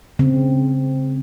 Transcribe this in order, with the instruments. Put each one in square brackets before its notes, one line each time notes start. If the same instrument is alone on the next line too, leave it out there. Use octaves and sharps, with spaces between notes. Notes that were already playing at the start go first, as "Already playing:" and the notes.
[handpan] C#3 C4